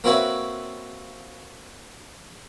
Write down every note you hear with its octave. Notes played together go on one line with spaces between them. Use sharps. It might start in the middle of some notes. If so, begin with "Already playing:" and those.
A#3 C4 F#4 B4 C#5 E5